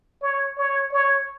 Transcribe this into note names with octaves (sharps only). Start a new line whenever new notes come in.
C#5
C#5
C#5